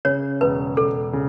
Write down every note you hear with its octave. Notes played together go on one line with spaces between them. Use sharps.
C#3 C#5
E1 B4
E1 A4
C#3